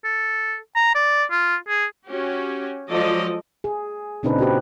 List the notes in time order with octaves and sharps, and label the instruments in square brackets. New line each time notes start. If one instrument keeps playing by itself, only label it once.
[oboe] A4
A#5
D5
F4
G#4
[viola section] C#4 F#4 G4
F3 F#3 G#3 A4 D5 D#5
[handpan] G#4
A#2 C#3 C4 D4 D#4 B4
C4 F#4 G4 B4